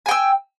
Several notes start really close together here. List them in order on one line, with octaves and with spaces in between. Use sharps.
G#5 G5 E6